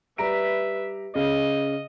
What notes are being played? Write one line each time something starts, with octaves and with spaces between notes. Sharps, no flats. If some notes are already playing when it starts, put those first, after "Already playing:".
G3 B4 E5 A#5 D7
C#3 D#5